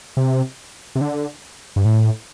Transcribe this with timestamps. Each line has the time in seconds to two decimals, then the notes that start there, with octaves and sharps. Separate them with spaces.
0.17 C3
0.95 C3
1.01 D3
1.76 G2
1.85 A2